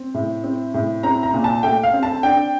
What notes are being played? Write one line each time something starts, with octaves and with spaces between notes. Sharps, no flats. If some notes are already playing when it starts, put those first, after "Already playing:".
Already playing: C4
A2
C4
A2
C4 A#5
A#5
A#2
A5
A3 G5
F5
C4
A5
D4 G5